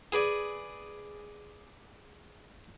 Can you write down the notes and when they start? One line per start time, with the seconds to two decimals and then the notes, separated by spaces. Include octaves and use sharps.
0.12 G#4 B4 D5 G#5